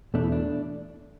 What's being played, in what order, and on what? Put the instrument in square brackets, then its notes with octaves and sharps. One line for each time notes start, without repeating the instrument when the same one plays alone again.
[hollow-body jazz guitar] E2 B2 A3 D4
E4
D4